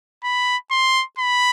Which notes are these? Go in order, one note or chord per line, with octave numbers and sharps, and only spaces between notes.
B5
C6
B5